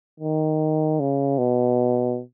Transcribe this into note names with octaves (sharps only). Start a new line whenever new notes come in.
D#3
C#3
B2